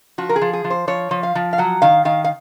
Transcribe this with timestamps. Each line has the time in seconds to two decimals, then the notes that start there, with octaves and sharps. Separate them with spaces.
0.18 F3 F#4
0.29 A#4
0.36 G#4
0.41 F3
0.53 G#4
0.64 F3
0.70 C5
0.88 F3 C#5
1.11 F3
1.23 F5
1.35 F3
1.53 F5
1.58 F#3 F#5
1.82 D#3 F5
2.05 D#3 F5
2.24 F5